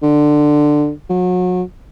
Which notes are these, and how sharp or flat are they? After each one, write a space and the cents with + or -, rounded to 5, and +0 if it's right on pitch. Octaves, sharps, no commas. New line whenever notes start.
D3 +15
F#3 -30